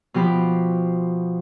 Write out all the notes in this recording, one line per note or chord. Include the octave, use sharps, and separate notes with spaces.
B2 F3 G4 C5 B5